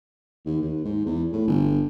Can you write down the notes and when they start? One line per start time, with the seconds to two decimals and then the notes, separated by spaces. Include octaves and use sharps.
0.45 D#2
0.61 D#2
0.84 G#2
1.05 E2
1.32 A2
1.47 G1